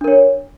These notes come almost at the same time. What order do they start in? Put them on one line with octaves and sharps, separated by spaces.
D4 A#4 C#5